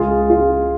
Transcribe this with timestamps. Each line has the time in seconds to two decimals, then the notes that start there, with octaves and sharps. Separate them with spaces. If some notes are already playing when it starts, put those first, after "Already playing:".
Already playing: C#2 F4 G#4
0.29 C#3 G#3 F4